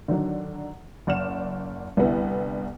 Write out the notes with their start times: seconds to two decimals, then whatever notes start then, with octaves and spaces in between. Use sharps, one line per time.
0.08 D3 D#3 F#3 D4
1.07 F#1 D5 F#5 F6 E7
1.97 C2 D3 B3 E4